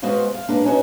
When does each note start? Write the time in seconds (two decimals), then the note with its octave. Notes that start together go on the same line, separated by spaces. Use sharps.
0.02 G#3 B3 F#4 B4 C5 F5
0.34 F5
0.48 G#3 A#3 D4 B4
0.64 C#4 D#4 F#4